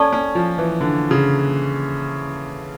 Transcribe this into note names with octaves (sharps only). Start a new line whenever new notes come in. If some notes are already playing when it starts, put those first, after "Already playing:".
Already playing: C#4 A4 D5 A5 C#6
C#4
F3
E3
D3
C#3